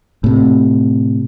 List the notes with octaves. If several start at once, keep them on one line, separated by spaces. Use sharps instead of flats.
A2 C3